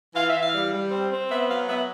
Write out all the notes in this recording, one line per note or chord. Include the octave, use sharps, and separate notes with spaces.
E3 F5
E5
E3
F5
G3
G3
C4
C4
B3 E5
F#3 F5
B3 E5